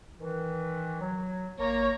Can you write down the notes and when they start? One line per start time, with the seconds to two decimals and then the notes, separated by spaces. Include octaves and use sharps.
0.19 D#3 E3
1.00 F#3
1.59 G#1 A#3 C#5 A#5